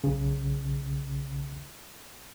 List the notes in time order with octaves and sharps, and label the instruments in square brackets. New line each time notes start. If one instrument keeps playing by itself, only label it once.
[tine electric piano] B1 C#3